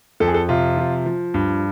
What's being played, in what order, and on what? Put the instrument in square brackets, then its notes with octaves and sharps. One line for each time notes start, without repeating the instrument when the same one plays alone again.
[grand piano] F2 A4
G#4
A4
C3 F4
F3
F3
G2